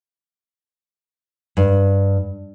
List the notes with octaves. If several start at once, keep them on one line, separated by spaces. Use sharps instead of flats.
G2